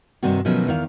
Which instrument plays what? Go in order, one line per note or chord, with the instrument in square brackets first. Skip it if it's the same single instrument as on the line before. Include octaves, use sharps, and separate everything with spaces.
[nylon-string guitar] G2 C3 D#3 C4 F#4
B2 D#3 F3 F#3 A3 C#4
E2 D#3 F5